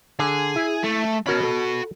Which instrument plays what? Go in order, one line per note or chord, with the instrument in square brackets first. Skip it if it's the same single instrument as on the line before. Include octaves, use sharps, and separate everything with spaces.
[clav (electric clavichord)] D3 [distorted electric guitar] G#4
[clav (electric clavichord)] E4
[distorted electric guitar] A3
[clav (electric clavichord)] C#4 A#4 A5 [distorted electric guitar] F#4 B5
[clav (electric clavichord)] A4